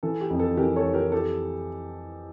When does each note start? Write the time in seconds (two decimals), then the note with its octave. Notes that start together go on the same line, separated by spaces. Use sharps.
0.03 E3 A4
0.21 G4
0.30 F2
0.39 A4
0.57 E3 G4 A#4
0.76 A4 C#5
0.85 F2
0.94 G4 A#4
1.12 G4 A4